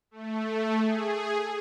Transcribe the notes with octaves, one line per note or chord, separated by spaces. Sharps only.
A3
G#4